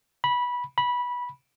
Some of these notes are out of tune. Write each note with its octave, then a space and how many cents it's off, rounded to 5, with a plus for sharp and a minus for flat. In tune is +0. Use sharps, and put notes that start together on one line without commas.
B5 -15
B5 -15